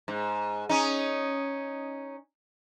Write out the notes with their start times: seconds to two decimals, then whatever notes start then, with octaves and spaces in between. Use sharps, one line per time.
0.08 G#2
0.69 C#4 D#4